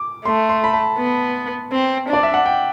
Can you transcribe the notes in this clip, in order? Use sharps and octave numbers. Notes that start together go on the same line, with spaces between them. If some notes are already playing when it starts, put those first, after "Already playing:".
Already playing: D6
A3 C6
C6
B5
A5
B3
C4
D4 D5
E5
F#5
G5